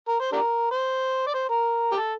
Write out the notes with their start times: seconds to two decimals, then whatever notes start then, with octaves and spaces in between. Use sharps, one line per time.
0.08 A#4
0.20 C5
0.32 D4 G4 A#4
0.71 C5
1.27 D5
1.34 C5
1.49 A#4
1.92 G4
1.97 A4